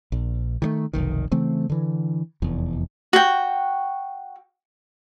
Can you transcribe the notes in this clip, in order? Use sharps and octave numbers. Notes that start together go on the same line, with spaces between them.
A#1
D#3 F#3 A3
F1 B1 D#3
C#3 E3 A3 C4
D3 E3
F1 E2
F#4 G5